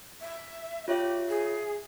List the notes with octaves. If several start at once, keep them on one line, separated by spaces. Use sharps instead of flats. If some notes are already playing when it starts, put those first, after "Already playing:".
E5
F4 G4 C#5 E5
G#4